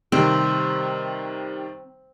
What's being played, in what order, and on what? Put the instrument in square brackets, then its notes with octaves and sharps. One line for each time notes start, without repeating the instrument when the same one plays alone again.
[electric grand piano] C3 D#3 G3 [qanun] C4